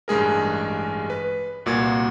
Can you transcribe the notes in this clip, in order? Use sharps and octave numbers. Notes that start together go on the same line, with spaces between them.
A1 G2 G#3 G#4 A#4
B4
C2 A#2 F#4 C#6 G#6